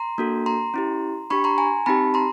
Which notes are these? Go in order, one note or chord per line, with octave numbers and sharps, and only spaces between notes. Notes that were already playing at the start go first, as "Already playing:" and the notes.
Already playing: A#5 C6
A#3 D4 F#4 A4
A#5 C6
C#4 E4 G4
D4 G4 B5 C#6
A#5 C6
G#5 A#5
C4 D#4 G4 A5 B5
A#5 C6